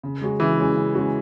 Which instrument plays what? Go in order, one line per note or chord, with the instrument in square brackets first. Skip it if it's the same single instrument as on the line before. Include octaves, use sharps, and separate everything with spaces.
[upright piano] C#3
G#3 C#4 F#4
[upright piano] C#3 [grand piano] E3
[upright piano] G#3 C#4 F#4
C#3
G#3 C#4 F#4